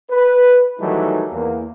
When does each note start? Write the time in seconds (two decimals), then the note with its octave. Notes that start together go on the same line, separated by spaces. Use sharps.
0.10 B4
0.80 D#3 E3 F#3 G3 A3 D#4
1.32 E2 A#3